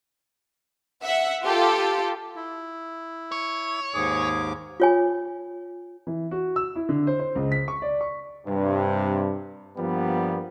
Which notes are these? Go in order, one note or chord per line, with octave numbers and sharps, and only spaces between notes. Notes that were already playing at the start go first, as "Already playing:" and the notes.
E5 F#5
F4 G4 A4
E4
C#5
D#2 G#2 G#4 D6
F4 C#5 G#5
E3
F#4
E6
E4
D3
C5
C5
C#2
B6
C#6
D5
C#6
G2 C3
G2 F3 G3 A#3 B3